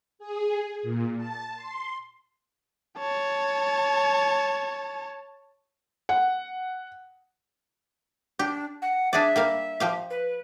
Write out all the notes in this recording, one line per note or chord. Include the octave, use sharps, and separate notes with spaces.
G#4
A#2
A5
C6
C#5 A5
F#5
D4 G4
F#5
D4 G#4 D5 E5
G3 A#3 F5
F3 G4 F5
B4